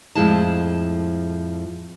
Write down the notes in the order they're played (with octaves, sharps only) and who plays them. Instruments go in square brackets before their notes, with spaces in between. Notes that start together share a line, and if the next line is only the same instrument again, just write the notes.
[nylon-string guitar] F2 A2 F3 G#3 E4 A5